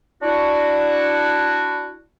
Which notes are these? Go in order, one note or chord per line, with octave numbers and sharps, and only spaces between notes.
D4 E4 F#4